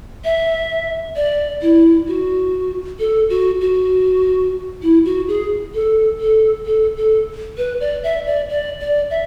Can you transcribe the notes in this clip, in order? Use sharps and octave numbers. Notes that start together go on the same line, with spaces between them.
E5
D5
E4
F#4
A4
F#4
F#4
E4
F#4
G#4
A4
A4
A4
A4
B4
D5
E5
D5
D5
D5
E5